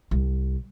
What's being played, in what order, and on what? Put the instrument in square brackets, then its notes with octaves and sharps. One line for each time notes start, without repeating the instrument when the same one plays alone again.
[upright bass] C2